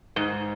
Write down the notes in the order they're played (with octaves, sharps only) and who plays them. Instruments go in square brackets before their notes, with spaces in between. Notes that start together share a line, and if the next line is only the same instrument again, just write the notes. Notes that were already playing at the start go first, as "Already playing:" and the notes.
[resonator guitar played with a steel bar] G#2